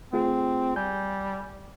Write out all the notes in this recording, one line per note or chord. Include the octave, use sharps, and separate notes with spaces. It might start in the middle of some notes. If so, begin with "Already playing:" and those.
A3 C4 F4 G#4
G3 G#5 G6